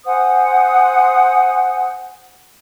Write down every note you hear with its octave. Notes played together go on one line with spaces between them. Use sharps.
C5 F#5 G#5 D#6